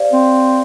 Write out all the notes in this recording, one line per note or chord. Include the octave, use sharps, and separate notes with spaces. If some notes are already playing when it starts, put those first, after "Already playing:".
Already playing: G4 C5 D5 F5
C4